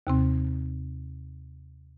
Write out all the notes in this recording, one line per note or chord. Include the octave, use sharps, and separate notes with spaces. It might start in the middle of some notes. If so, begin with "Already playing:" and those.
D#2 C3 C4